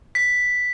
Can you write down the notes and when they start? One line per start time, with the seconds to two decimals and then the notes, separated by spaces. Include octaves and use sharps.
0.15 B6